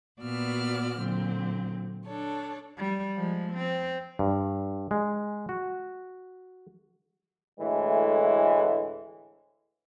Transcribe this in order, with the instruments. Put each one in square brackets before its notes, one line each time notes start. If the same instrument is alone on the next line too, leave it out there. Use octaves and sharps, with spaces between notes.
[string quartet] A#2 B3 F#4 D5 E6 F6
A#2 D3 F#3 C4
D4 A4 C#5
[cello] G3
F3 G#3
C4
[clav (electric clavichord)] G2
G#3
F#4
[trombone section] D2 A2 E3 G#3 A3